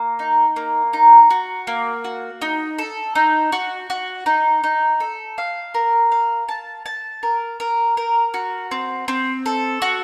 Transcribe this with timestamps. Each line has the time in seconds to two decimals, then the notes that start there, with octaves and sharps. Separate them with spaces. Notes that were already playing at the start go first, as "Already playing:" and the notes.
Already playing: A#3
0.19 D#4
0.56 A#3
0.93 D#4
1.30 F#4
1.67 A#3
2.04 F#4
2.42 D#4
2.78 A4
3.15 D#4
3.52 F#4
3.90 F#4
4.26 D#4
4.64 D#4
5.00 A4
5.38 F5
5.74 A#4
6.12 F5
6.48 A5
6.86 A5
7.23 A#4
7.60 A#4
7.97 A#4
8.34 F#4
8.71 C4
9.08 C4
9.46 A4
9.82 F#4